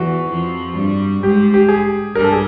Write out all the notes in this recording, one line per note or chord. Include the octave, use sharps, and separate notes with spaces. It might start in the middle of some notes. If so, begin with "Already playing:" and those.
Already playing: E2 E3 F#4
F2 F3
G2 G3
G#2 G#3 G4
G4
G#4
G2 G3 A#4
A4
G#4